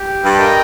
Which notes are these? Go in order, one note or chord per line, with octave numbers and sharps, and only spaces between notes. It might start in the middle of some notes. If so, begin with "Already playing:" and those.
Already playing: G4
G2
A#4 D#5 G5